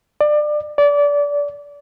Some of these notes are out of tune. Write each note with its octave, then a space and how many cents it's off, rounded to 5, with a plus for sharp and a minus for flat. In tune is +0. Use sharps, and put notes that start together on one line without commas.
D5 +25
D5 -25